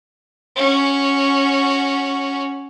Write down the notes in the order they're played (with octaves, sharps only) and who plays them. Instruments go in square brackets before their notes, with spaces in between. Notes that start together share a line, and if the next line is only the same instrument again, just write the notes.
[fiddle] C#4 F#4